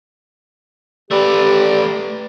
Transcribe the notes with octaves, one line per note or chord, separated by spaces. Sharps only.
A3 G4 B4 D5